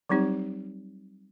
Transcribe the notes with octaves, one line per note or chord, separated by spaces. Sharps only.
F#3 G3 C4 D#4 G4